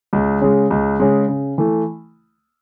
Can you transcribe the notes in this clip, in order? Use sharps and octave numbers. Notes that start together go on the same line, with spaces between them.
C#2
C#3 G#3
C#2
C#3 G#3
C#3
E3 A3